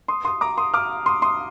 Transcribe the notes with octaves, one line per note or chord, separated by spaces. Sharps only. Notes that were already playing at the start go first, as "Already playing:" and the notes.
C6 D#6
C6 D#6
A#5 D6
C6 D#6
D6 F6
C6 D#6
C6 D#6